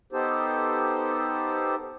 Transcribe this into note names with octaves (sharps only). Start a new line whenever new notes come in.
B3 D#4 G4 A4 C5